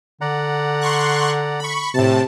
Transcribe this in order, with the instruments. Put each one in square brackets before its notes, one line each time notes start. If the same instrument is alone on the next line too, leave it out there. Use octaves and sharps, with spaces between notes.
[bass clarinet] D3 [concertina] D5 F#5 A#5
[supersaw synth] C6 C#6 F#6
B5 C#6
[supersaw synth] A2 A5 [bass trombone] C3